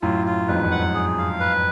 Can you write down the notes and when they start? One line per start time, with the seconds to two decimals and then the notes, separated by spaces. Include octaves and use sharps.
0.02 F#2 A2 F4
0.26 F4
0.48 F2 G#2 B4
0.64 F2
0.71 F#5
0.79 F#2
0.94 G#4
1.18 F5
1.40 B4